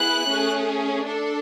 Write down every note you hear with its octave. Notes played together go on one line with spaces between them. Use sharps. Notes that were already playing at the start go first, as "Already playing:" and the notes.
Already playing: B3 E4 G#4 F#6
A3 C#4 G#4
D4 A4